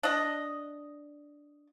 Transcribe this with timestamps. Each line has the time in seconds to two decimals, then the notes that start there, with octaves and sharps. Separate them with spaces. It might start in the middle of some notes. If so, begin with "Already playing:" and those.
0.03 D4 D#5